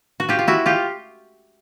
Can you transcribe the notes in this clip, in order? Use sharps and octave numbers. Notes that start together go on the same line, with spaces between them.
F#4
F4 G4
F4
E4 F#4
F4 G4